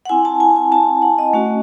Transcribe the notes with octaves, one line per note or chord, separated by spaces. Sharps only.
F#5
C4 E4 G#5
A5
G#5
G#5
C4 E4 A5
F#5
D#5
A3 C#4 F#4